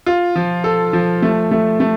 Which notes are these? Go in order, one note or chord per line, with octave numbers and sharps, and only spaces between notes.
F4
F3
A4
F3
A3
A3
A3